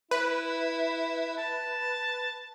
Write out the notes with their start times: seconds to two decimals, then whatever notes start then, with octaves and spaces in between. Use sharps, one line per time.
0.11 E4 B4
1.38 A5